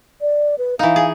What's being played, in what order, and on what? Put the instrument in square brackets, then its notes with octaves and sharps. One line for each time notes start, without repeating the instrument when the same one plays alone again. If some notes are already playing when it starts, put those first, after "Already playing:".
[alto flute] D5
B4
[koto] E3 D#4 [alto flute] F5
[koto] G#4